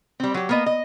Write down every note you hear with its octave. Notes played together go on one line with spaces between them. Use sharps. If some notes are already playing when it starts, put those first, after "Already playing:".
G3 C4
F#3 G4
A#3 B3 D#5
D#5